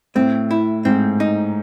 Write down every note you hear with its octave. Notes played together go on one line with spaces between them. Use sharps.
A2 C4
E4
G#2 C4
D#4